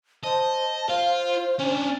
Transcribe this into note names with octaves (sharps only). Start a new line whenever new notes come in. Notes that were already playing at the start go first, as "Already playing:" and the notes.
C5 D#5 A5
F4 C5 F5
C#4 D4 G#5